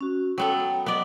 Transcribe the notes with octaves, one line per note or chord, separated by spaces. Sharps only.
C#4 F#4
F#3 B3 A4 G5
F#3 B3 D5 D#5